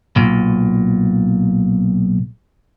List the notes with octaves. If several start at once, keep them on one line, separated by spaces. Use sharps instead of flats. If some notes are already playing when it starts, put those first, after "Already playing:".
B1 A#2